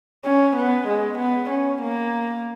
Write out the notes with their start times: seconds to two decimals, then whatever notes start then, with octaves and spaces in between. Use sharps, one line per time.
0.25 C#4
0.56 B3
0.87 G#3
1.18 B3
1.50 C#4
1.82 A#3